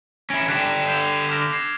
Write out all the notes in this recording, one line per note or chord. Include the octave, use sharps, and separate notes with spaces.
C#4 E4 G#6 A#6 D7
D3 D4 G4 F#6 A6 B6
E6 G6 F7
D6 F6 A#6
G#6 C7 E7